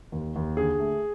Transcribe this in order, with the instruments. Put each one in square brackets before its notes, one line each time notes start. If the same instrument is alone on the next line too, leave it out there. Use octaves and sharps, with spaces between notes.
[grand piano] D#2
D#2
D3 G#4
A3